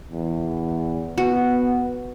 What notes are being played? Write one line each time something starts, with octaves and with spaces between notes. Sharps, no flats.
E2
B3 F#4